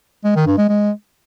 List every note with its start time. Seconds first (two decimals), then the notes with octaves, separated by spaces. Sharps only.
0.25 G#3
0.36 D#3
0.47 G2
0.58 G#3
0.69 G#3